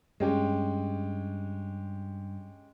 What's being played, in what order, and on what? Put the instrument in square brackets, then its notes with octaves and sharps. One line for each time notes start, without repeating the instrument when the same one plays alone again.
[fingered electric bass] G2 [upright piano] G#3 C#4 G4